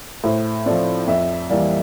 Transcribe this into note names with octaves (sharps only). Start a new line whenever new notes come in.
A2 C5
F3 A3 C4 D5
F2 E5
E3 G3 A#3 D5